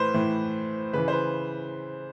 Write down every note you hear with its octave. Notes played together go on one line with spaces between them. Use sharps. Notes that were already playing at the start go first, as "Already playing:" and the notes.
Already playing: A2 E3 B4 C5
A2 E3
C#3 E3 B4
C5
B4